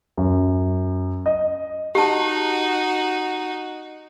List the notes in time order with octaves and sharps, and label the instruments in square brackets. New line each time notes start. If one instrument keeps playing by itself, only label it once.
[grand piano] F#2
D#5
[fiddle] D#4 F#4 [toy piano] G4 A5